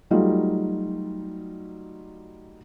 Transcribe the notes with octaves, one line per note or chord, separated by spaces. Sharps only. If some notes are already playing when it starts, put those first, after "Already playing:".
F#3 G3 A3 D#4 F4